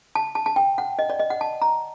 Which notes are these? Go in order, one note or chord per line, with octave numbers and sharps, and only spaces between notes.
A5
A5
A5
G5
F#5
D#5
D5
D#5
F#5
A5
A#5